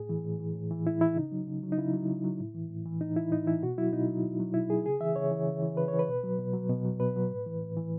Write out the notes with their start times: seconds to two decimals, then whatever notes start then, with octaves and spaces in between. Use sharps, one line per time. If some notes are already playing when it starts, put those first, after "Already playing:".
Already playing: A2 G#4
0.09 E3
0.25 A2
0.40 E3
0.55 A2
0.71 E3
0.85 A2 E4
1.01 E3 E4
1.16 C#3 D#4
1.32 F#3
1.47 C#3
1.63 F#3
1.72 D#4
1.78 C#3 E4
1.93 F#3
2.09 C#3
2.24 F#3
2.40 A2
2.55 E3
2.70 A2
2.85 E3
3.01 A2 D#4
3.16 E3 E4
3.32 A2 D#4
3.47 E3 E4
3.63 B2 F#4
3.78 F#3 E4
3.93 B2 D#4
4.08 F#3
4.24 B2
4.40 F#3
4.54 B2 E4
4.70 F#3 G#4
4.85 C#3 G#4
5.01 E3 E5
5.16 C#3 C#5
5.31 E3
5.47 C#3
5.62 E3
5.77 C#3 B4
5.88 E3 C#5
5.99 B4
6.08 B2
6.23 F#3
6.39 B2
6.54 F#3
6.69 B2
6.85 F#3
7.00 B2 B4
7.16 F#3
7.31 A2
7.46 E3
7.61 A2
7.77 E3